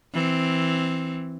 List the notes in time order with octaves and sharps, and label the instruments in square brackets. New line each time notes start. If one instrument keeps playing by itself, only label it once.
[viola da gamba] E3 C4